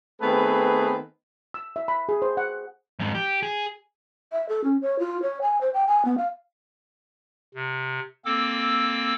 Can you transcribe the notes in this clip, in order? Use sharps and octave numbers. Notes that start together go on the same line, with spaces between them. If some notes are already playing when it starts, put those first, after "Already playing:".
D#3 A3 B3 C4 G#4 B4
E6
E5
B5
G#4
C5
F#5
F2 G#2
G4
G#4
E5
A4
C#4
C#5
F4
C#5
G#5
C5
G5
G#5
B3
F5
C3
A#3 C4 A4 D6 E6